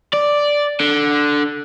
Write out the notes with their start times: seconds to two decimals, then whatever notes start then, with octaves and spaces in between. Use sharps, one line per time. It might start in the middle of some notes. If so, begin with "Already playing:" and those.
0.14 D5
0.80 D3